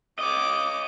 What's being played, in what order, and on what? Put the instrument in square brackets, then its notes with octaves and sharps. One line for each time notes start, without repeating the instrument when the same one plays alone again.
[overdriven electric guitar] C#5 D#5 [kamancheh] D6